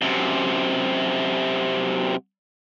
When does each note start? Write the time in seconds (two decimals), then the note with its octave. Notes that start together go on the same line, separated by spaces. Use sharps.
0.02 F#2 C3